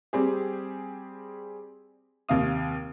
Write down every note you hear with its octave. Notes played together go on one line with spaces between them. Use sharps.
G3 C4 G4 G#4
D#2 C3 F5 D#6